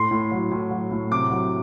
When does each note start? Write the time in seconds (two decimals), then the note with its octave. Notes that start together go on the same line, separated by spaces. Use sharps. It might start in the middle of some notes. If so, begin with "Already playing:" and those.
Already playing: A2 C6
0.11 A2
0.31 F#3
0.51 A2
0.71 F#3
0.91 A2
1.11 C3 D6
1.31 F#3